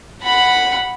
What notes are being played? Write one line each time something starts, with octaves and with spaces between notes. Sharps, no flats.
F#5 B5